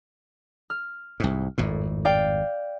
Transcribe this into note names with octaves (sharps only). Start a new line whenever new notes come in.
F6
C2 G#2
G#1 F2 A2
D5 F5 G5